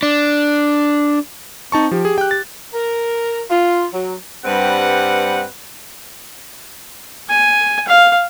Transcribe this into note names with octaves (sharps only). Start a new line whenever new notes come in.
D4
C4 D#4 A5 C#6
F3 G4
G#4
G5 F#6
A6
A#4
F4
F#3
G2 G3 C4 B4 F#5
G#5
F5